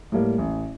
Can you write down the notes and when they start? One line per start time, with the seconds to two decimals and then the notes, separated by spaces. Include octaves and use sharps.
0.12 A2 G3 A#3
0.38 A1